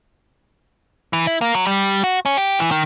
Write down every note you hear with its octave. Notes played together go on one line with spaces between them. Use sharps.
E3
E4
A#3
F#3
G3
F#4
C#4
G4
E3
D#3